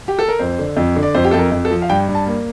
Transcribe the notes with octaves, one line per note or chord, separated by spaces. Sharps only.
G4
A4
A#4
F2 C5
D3
F2
D3
D5
F2 C5
G4
F2 A4
A#4
F2
A4
F3
F5
G2 G5
G2
A5
A#3